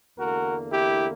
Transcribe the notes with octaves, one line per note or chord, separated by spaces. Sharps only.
E2 D3 A#3 F#4 A#4
E4 G4